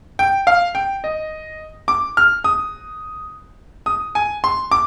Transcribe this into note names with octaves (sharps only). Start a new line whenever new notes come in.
G5
F5
G5
D#5
D6
F6
D#6
D#6
G#5
C6
D6